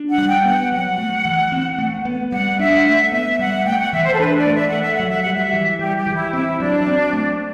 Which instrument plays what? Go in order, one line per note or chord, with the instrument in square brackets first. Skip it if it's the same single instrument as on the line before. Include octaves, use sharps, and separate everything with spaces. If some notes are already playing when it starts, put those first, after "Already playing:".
Already playing: [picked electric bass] D4
[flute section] F#5
[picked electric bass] G3
[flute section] G5
[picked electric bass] B3 [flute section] F#5
[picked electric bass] F#3 [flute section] F#5
[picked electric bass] A3
E3
C4
A3
B3
[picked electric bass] G3 [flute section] F#5
[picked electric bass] D4 [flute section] E5
[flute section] F#5
[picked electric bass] A3 [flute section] E5
[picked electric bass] B3 [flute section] E5
[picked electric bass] G3 [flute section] F#5
[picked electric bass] A3 [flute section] G5
[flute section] F#5
[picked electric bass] E3 [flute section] E5
[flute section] C5
A4
[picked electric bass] D4 [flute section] B4
[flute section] D5
[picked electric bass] A3
[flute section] E5
[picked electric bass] A3 [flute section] F#5
[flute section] E5
[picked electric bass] F#3 [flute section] F#5
[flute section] E5
F#5
[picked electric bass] G3
[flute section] E5
[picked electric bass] E3
[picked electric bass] G3 [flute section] G4
[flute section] G4
[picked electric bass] E3
[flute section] E4
[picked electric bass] C4 [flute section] E4
[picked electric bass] F#3 [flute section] D4
[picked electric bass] C4
A3